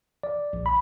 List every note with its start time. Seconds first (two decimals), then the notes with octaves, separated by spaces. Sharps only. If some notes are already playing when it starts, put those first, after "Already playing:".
0.23 D5
0.53 A#1
0.66 B5